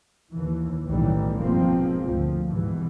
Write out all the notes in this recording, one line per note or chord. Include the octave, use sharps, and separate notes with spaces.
D#2 E3
B1 F#2 A2 D#3 E3 G3
F1 G#2 B2 F3 A#3 C4
D2 F3
G#1 G#2 B2 E3 G3